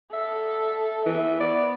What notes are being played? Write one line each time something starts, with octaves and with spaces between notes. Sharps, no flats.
A4 E5
E3 E5
B3 D5